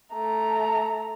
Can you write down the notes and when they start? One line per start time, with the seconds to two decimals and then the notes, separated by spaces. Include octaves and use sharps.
0.13 A3 A#5